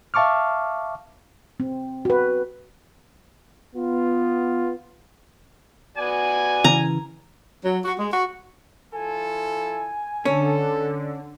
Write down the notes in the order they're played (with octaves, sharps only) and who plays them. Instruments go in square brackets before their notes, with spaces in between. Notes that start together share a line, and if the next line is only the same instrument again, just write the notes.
[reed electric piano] E5 F5 A5 C#6 D6 F6
[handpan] C4
F#4 B4
[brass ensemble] B3 F4
[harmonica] B3 F#4 D5 [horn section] G#5
[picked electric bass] C#3 E3 [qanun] A#5
[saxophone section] F#3
F#4
G#3
F#4
[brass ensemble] F3 E4 A4 [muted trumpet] G#5
[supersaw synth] D3 [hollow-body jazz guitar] C#4 [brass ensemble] A4